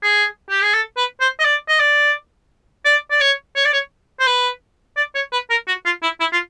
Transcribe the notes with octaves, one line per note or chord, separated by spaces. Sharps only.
G#4
G4
G#4
A4
B4
C5
D#5
D5
D#5
D5
D5
D5
C#5
C#5
D5
C#5
C5
B4
D5
C#5
B4
A#4
F#4
F4
E4
E4
F4